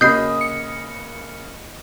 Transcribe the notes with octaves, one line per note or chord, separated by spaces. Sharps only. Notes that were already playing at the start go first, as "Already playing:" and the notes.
C#3 A#3 F#4 D#5 B5 D#6 G6 C7
C#7